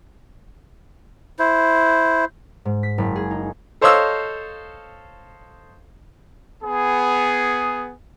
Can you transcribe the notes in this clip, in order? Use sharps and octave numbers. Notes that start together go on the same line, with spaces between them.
E4 C5
G#2
B6
F#1
G#4
D#4
A4 C5 C#5 D#5 F5 E6
B3 G#4